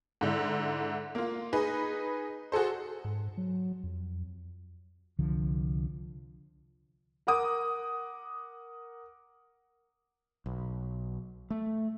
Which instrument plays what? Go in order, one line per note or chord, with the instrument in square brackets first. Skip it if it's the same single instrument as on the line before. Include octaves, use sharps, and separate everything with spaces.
[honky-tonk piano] G#2 D3 E4
A#3 F4
D#4 G#4 B4
F#4 G#4 A4 C5
[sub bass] G#2
F#3
F2
[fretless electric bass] C2 D3 F3
[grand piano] A#4 F#5 D6 D#6
[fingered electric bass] B1
A3